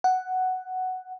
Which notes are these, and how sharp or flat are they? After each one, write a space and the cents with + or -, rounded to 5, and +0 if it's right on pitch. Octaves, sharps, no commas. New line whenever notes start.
F#5 +5